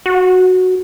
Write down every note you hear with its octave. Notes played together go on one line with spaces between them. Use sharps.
F#4